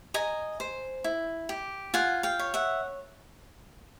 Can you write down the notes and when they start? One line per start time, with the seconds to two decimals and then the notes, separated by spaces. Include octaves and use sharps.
0.14 D#5 G#5 A#5
0.60 C5
1.04 E4
1.49 G4
1.94 F4 F#5 G#5
2.23 F5 G5
2.39 C#5
2.54 E5 F#5